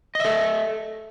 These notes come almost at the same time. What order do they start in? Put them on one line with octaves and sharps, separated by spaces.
D#5 E5 A4